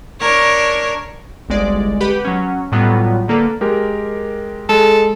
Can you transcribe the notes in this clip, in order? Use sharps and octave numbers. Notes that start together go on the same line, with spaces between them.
D4 A#4 C#5
G1 C2 G#3 D5
G4 B4 F#5 B5
F#3 C#4
A2 F#3 G3 B3 F4
D3 A#3 A4 B4
G#3 G4 A#4
G#3 A4